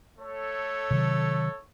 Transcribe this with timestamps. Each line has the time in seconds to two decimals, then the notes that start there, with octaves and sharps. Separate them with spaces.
0.19 A3 A4 C#5
0.91 C3 D#3 F#3